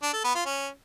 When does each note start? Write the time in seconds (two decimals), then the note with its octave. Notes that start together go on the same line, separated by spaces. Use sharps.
0.03 D4
0.13 A4
0.24 B3
0.35 F4
0.46 C#4